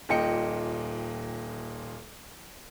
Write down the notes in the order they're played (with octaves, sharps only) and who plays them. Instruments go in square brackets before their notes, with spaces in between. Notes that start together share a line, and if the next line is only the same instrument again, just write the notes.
[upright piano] D#1 A#2 D#5 G5 C#7